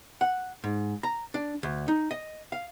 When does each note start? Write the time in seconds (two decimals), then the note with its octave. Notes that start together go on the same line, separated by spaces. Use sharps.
0.21 F#5
0.64 G#2
1.03 A#5
1.34 D4
1.63 D2
1.88 D#4
2.11 D#5
2.52 F5